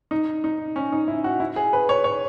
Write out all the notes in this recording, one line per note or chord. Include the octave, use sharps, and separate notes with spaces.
D#4
D#4
C#4
D#4
E4
F#4
E4
G#4
B4
C#5
C#5